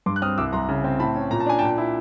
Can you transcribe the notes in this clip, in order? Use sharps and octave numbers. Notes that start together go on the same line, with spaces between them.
G2 C6 D6
F#6
C4 D#6 F6
C2 D6 E6
C2 A#5 C6
C#3
C4
A2 A5 B5
C#4
A#2 A#5
A5
D4 G#5
A#2 G5 A5
E4